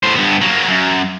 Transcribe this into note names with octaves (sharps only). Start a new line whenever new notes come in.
A2 C5
G2 B3
F#3 A#3
F#2